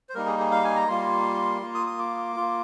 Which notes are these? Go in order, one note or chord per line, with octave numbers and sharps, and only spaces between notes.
C5
G3 A#3 D#4 A#4
G#4
G#4
F5
G#5
A#5
G3 A#3 F4 C6
A#3 F4
D#6
D#6
D6
A#3 F4